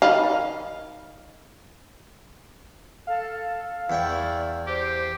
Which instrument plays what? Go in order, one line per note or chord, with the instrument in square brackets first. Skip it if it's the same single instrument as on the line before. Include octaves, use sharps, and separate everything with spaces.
[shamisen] D#3 D#4 B5 [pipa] F5
[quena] A4 [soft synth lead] F5
[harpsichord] E2 G5 C#6 [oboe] E4 [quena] D5
[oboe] G4 [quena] C5